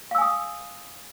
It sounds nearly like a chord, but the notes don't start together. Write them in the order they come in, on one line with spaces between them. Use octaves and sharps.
F5 E6 G#5 D#6